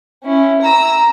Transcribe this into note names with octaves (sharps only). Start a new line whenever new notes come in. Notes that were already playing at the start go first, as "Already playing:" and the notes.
C#4 E4
A#5 E6